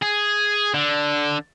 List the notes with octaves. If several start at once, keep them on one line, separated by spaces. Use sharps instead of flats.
G#4
D3